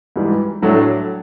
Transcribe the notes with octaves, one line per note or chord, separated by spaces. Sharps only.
G#2 E3 G3
A2 F#3 A3 D4